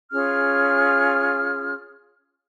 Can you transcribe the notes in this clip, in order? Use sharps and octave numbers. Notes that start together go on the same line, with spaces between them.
C#4 F4 G#4 F6